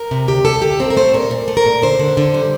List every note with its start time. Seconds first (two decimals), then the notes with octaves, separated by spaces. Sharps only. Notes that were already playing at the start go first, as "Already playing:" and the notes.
Already playing: A#4
0.11 C3
0.28 D2 G4
0.45 D2 A4
0.62 D2 G4
0.80 C4 A#4
0.90 A#4
0.97 A3 C5
1.14 A#2 A#4
1.31 A#2
1.48 A3
1.57 A#4
1.66 A#2
1.82 D3 C5
1.99 D3
2.17 D3
2.34 G3